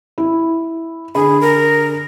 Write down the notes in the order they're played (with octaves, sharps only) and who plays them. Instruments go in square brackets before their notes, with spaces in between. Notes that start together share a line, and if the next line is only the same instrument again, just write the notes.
[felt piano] E4
[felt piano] D3 B5 [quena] G#4
[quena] A#4